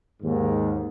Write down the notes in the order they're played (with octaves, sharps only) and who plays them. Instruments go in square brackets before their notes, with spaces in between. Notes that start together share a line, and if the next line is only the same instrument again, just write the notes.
[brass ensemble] D#2 G#2